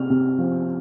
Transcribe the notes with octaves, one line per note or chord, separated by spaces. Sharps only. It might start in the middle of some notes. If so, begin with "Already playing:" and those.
Already playing: C3 F6
C3
F3